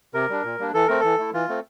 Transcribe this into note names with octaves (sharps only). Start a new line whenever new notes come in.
C3 A#4
G3 D4
A#2
G3 A#3 D4
E3 A4
A3 C4 A#4
E3 A4
A3 E4
E3 F4
A3 C4